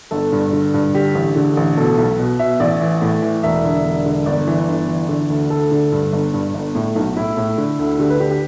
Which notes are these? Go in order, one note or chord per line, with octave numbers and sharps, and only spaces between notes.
G1 A4
G2
D3
G2
D3 G4
A1
D3
A1
B2 A4
B1
B2
B2 E5
A1 D5
E3
A2
E3
E1 E5
D3
E1
D3
G1 D5
E3
G1
E3
D3
D2
D2 A4
D3
G2
G1
G2
G1
A2
B1
A2 E4
A2
D3
D2
D3 G4
B4
D3 G4
G4